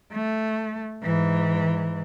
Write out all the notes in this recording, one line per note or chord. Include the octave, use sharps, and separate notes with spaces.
A3
G#2 E3